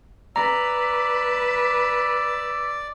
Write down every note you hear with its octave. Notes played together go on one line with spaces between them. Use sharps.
B4 D5 A#5 E6